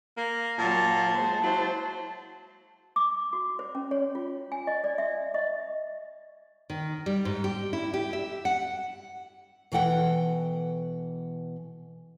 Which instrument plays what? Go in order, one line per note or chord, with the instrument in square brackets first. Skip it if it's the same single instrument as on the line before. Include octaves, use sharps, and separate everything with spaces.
[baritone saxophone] A#3
[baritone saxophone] A#2 [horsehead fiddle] F#3 A#3 [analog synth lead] A5
[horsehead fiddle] G#3 C5
[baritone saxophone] F#3 [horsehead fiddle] E4 C5
[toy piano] D6
F#4
C5
C#4
C#5
F4
G#5
D#5
D5
E5
D#5
[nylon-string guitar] D#3
G3
G#2
G4
E4
G4
E5
F#5
B2 E3 A4 F#5 G5